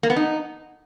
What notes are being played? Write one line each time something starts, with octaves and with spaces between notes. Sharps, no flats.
A#3
B3
D#4